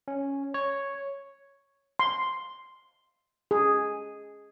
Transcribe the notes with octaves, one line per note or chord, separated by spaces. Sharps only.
C#4
C#5
C6
G#4